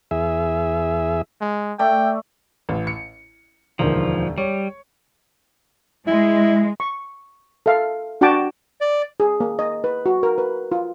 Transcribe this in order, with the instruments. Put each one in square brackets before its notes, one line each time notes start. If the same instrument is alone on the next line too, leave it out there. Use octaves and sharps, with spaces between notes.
[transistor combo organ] E2 G#4 E5
[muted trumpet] G#3
[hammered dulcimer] A3 D5 E5 [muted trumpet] G5
[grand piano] A1
C#7
[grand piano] E1 D2 D#3 [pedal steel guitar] F3
[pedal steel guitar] G3 [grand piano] C#5
[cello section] G#3 [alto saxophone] E4
[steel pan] C#6
A4 E5 F5
D4 F#4 F#5 G5 A5 D6
[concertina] D5
[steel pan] G#4
A#3
D#5
B4
F#4
A#4
B4
F4